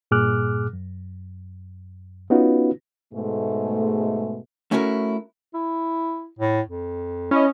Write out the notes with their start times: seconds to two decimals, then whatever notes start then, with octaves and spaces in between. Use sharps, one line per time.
0.11 G2 A#2 G#4 D6 F6 F#6
0.73 F#2
2.30 B3 C#4 D#4 F4 F#4 B4
3.13 G#2 B2 G#3 A3
4.71 A3 C#4 E4 F#4 G#4 A#4
5.54 E4
6.39 A2
6.68 F2
7.31 C#4 E4 D#5